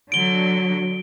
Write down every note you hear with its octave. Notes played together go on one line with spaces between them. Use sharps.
D3 F#3 D7 G7